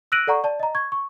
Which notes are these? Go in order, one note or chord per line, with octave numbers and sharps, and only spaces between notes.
E6 F#6 A#6 D7 D#7 F#7
A4 D5 F#5 A#5 C#6
D5 A5
D#5 A#5
C#6 G#6
C#6